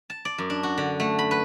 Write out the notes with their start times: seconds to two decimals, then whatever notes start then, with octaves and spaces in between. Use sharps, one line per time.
0.10 A5
0.25 D5
0.38 F#2
0.50 D4
0.63 F#4
0.78 D3
1.00 A3
1.19 B5
1.31 B4